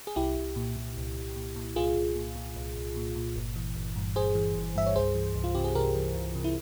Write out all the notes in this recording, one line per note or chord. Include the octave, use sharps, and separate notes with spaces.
G#4
C2 E4 G4
C2
A#2
A#2
C2
C2
A#2
A#2
C2 F4 G#4
C2
A#2
A#2
C2
C2
A#2
A#2
G1
E3
G1
G2
G1 G#4 C5
E3
G1
G2 E5
C#5
C2 G#4 C5
E3
C2
F4
C3 G4
G#4
C2 G4 A#4
E3
C2
C3
E4